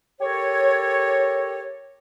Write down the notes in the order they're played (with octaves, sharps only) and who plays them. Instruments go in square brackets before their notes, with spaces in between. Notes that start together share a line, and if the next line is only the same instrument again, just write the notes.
[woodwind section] G4 A4 A#4 C#5